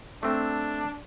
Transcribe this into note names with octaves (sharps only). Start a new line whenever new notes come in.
A3 C4 D4